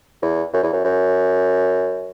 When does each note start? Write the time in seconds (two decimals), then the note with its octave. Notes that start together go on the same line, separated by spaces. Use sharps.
0.22 E2
0.53 F#2
0.63 E2
0.73 F#2
0.84 F#2